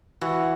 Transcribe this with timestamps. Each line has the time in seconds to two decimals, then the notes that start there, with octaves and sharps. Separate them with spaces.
0.21 E3 F#4